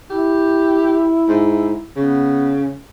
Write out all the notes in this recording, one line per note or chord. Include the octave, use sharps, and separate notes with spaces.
E4 G4
G#2
C#3 B3